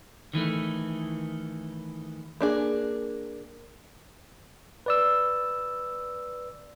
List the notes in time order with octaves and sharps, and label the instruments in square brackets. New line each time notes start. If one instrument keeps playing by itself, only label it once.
[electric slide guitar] D#3 E3 A3
[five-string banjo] A#3 D4 G#4
[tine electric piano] B4 D5 E6